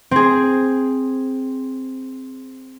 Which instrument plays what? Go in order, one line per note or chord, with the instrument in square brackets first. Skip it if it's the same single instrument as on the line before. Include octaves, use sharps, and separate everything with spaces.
[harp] C4 G#4